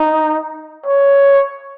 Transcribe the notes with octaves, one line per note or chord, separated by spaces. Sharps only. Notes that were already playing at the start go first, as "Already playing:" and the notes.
Already playing: D#4
C#5